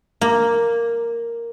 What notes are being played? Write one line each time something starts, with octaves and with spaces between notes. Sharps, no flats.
A#3